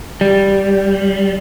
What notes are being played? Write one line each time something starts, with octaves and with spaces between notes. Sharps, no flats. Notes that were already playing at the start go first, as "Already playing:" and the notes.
G3